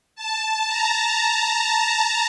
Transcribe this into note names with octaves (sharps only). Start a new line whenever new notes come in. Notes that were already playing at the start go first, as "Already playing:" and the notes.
A5
A#5